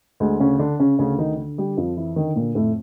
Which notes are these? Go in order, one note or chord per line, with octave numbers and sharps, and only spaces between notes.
D2 G#3
C#3 C#4
D3 D4
C#3 C#4
D2 C#3 C#4
D#3 D#4
D3
G3 G4
F2 F3 F4
E3 E4
D3 D#3 D#4
A#2 A#3
F2 A2 A3